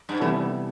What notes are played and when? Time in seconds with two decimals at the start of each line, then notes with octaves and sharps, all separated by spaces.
0.09 G2
0.20 C3 E3 G3 B3 E4 A4